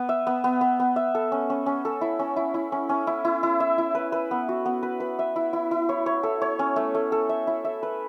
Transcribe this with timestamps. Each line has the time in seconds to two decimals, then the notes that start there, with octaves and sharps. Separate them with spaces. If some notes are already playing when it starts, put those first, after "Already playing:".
Already playing: B3
0.09 E5
0.27 B3
0.44 B3
0.61 B3
0.79 B3
0.96 E5
1.15 A4
1.32 C#4
1.50 C#4
1.66 C#4
1.85 A4
2.01 E4
2.19 C#4
2.36 E4
2.54 E4
2.72 C#4
2.89 C#4
3.07 E4
3.25 E4
3.43 E4
3.60 E5
3.78 E4
3.95 B4
4.12 B4
4.31 B3
4.49 F#4
4.66 B3
4.83 B4
5.00 B4
5.19 E5
5.36 E4
5.53 E4
5.71 E4
5.89 C#5
6.06 C#5
6.23 A4
6.42 C#5
6.59 C#4
6.76 A3
6.95 A3
7.12 A4
7.29 E5
7.47 E4
7.65 E5
7.83 B4